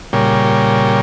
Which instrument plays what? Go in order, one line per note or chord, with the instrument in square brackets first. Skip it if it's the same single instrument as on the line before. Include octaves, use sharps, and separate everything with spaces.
[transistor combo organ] A#2 C#3 G3